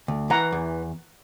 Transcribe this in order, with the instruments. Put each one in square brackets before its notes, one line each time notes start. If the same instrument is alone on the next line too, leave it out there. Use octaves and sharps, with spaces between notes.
[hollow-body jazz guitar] D2
[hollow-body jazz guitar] E3 [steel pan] F#5 A#5
[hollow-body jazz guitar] E2